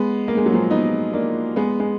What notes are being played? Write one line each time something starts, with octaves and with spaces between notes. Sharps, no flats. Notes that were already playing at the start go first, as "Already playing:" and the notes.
Already playing: G#3 B3
A#3
G#3
F#3
F3 G#3
B3 D#4
A#3 D4
G#3 B3
G#3